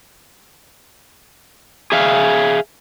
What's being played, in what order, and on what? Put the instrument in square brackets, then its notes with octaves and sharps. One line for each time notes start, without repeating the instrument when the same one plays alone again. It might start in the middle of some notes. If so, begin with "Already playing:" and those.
[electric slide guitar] G#4 E5 F5